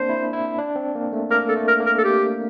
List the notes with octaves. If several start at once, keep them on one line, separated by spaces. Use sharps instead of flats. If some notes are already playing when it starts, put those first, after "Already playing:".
Already playing: A#3 C4 D4 C5
E4
E4
D4
C4
A#3
A3
A#3 A#4
A4
A3
A#4
A#3
A#4
A4
G4